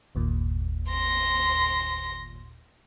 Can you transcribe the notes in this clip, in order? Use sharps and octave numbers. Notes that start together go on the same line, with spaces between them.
G1 D#2 A#2
C6 A#6